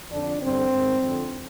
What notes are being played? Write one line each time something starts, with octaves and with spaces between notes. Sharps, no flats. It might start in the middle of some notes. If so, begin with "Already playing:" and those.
F2 D3 D4
G2 D3 C4
G#2 D#3
F2 D3